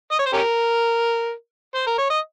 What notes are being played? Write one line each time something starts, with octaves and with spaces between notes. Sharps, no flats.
D#5
C#5
C5
C#4 G4 A#4
C5
A#4
C#5
D#5